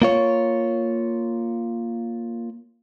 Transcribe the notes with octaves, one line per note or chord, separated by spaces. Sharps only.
A#3 F4 C#5